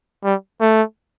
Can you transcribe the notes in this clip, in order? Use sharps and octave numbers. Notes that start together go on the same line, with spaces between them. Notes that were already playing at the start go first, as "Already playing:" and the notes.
G3
A3